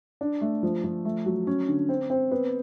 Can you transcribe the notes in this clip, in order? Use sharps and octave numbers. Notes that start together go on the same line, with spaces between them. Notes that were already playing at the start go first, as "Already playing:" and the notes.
D4
A3
F3
F3
A3
F#3
C#4
D3
C4
C4
B3